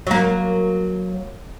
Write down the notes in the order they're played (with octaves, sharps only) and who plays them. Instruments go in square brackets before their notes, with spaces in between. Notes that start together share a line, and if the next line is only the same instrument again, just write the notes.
[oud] F#3 A#3